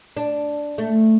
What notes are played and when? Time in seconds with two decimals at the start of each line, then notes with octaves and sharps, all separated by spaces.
0.17 D4
0.78 A3